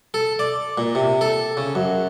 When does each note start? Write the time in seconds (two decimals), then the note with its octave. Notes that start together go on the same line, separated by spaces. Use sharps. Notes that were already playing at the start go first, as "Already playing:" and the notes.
0.14 A4
0.39 D5
0.78 A#2
0.95 C3
1.21 A4
1.57 C#3
1.75 F#2